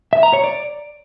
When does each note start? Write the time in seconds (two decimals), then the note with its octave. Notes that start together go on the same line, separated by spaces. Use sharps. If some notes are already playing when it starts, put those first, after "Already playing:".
0.13 E5
0.23 A#5
0.33 C#5
0.44 D5